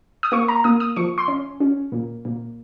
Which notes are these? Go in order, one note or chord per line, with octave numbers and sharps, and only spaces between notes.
D#6
A#3 C#6
A#5
A#3 D#6
D#6
F3 C#6
C6
C#4
C#4
A#2
A#2